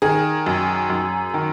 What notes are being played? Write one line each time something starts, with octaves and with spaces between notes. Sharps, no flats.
D#3 G#4
F#2
F#2
D#3